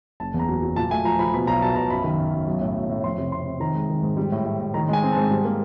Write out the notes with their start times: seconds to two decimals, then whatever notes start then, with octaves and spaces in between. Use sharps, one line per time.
0.20 F#1 A5
0.34 E2
0.39 A#5
0.49 F#3
0.62 F#3
0.76 A#2 A5
0.91 A3 G#5
1.05 F3 A#5
1.19 F3 B5
1.34 B2 B5
1.47 B1 A#5
1.62 B2 A5
1.76 B1 A#5
1.90 F#2 B5
2.04 D#3
2.18 F#2
2.33 F#2
2.48 B1
2.61 A2
2.76 B1
2.89 A2
3.04 F2 C6
3.18 C3
3.32 C3 C6
3.46 C3
3.60 D#3 A#5
3.74 G#3
3.90 D#3
4.03 G#2
4.17 G3
4.32 A2
4.46 A2
4.61 A2
4.74 D#3 A#5
4.89 G#3 G#5
5.03 C4
5.12 G#2 A5
5.31 G3
5.45 A#3